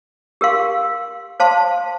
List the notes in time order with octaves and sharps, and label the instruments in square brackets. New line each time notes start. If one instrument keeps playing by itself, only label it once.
[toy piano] G4 A#4 F5 C6
C5 F5 A5 C6